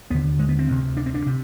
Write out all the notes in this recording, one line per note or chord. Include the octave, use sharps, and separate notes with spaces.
D#2 D3 B3
G#3
B3
C4
D2 C3
D4
C4
D4
C3